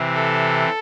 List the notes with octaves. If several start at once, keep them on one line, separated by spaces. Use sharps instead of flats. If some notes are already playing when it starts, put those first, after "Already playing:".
Already playing: C3 E3 C4
A4